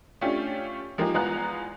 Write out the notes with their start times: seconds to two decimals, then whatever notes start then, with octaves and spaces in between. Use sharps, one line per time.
0.21 A3 C#4 D4 F4 G4
0.98 F3 G#3 A#3 D#4 G4
1.14 E2 G#3 B3 F4 A#5 F#6